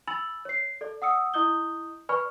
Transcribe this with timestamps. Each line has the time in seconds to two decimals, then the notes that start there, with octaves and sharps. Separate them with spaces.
0.07 G#5 B5 E6 A6 F#7
0.45 C#5 C7
0.81 A4 D5
1.02 F#5 D#6 E6 C#7
1.34 E4 D#5 D#6 G6 G7
2.09 B4 D5 G#5 B5 C#6 F6